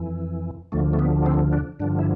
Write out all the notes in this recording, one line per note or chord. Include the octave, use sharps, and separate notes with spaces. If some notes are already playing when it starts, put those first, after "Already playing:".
Already playing: F2 E3
D2 D3 F3 A3
A3
B3
C4
D4
G2 D3 F3 D4
E4